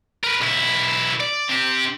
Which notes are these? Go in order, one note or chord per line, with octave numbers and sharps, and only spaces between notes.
A#4 B4
B1 E4
D5
C4 G4